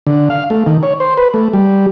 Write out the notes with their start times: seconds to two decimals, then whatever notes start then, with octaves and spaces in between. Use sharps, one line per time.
0.07 D3
0.30 F5
0.50 A3
0.66 D#3
0.83 C#5
1.00 C5
1.17 B4
1.34 A3
1.53 G3